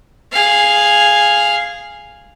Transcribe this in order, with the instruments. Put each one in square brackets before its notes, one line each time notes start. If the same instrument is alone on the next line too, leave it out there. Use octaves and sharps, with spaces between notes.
[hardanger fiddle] G#4 F5